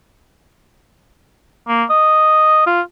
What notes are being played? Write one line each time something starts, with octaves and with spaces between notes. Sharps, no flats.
A#3
D#5
F4